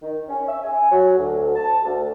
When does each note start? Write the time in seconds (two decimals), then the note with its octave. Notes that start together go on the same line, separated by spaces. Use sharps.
0.02 D#3
0.28 C#4
0.48 E5
0.63 G#5
0.91 F#3
1.16 D2
1.55 A5
1.84 D2